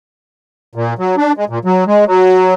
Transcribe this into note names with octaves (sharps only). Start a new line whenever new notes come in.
A#2
F#3
D4
G#3
A#2
F#3
G#3
F#3